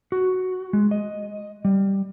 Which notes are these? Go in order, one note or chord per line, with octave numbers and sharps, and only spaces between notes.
F#4
G#3
D#5
G3